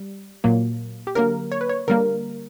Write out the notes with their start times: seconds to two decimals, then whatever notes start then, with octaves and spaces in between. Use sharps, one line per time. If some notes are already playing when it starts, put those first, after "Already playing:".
Already playing: G3
0.44 A#2 F#3 A#3
1.07 G4
1.15 D3 F#3 A#3 A#4
1.52 C#5
1.61 B4
1.69 C#5
1.88 D3 G3 A#3 A#4